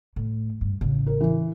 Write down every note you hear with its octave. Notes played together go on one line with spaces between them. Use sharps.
A2
G2
A1 C#3
A#4
E3